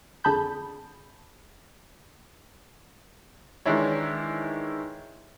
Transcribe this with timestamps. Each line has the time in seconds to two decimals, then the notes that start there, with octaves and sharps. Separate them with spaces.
0.24 F2 D3 G#4 A5 B5 G6
3.66 D#3 E3 G#3 D4 E4 C#5